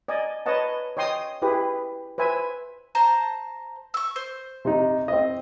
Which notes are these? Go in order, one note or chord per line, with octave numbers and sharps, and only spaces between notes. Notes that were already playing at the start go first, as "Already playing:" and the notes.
D5 D#5 G#5
B4 C#5 D#5 F#5 A5
C#5 D#5 G5 C6 D#6
E4 G4 G#4 B4
B4 C5 E5 G#5
C5 A5 A#5
C#6 E6
C5
C3 D#4
C4 D#5